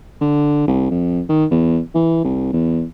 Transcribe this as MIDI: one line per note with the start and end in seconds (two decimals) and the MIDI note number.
0.21 0.64 50
0.68 0.89 36
0.91 1.22 41
1.29 1.45 51
1.51 1.79 40
1.95 2.23 52
2.24 2.52 36
2.53 2.84 40